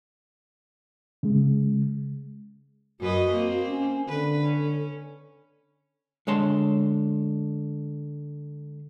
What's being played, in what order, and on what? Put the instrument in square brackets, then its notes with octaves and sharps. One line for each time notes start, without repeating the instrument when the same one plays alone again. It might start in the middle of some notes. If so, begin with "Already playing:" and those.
[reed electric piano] C#3 G#3
[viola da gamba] F#2 B4 D#5 [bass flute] F#4
[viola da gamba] A#3 C4
[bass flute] C#4
[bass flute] D3 [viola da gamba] B4
[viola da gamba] C#4
[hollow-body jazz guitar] D3 G#3 C#5 A5 C6